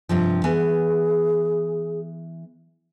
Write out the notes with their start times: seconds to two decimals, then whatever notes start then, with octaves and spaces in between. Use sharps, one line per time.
0.09 G2 C3 F3
0.44 E3 B3 G#4 G#5